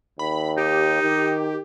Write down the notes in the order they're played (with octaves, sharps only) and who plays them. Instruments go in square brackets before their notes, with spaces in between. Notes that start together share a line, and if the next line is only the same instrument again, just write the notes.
[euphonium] D#2 [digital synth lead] B5
[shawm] D#4 [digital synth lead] G4
[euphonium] D#3